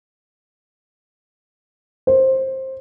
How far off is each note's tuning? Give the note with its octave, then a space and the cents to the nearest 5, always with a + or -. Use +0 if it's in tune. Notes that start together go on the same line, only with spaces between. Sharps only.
C5 +15